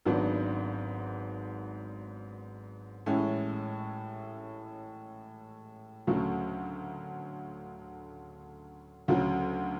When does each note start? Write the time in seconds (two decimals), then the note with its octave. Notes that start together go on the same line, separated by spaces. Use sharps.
0.05 G#1 G#2 F#3 B3 D4
3.06 A1 A2 G#3 C#4 E4
6.07 D2 C#3 F#3 A3
9.08 D2 C#3 F#3